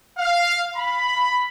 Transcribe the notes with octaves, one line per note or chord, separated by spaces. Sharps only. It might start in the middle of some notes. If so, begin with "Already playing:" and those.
F5
B5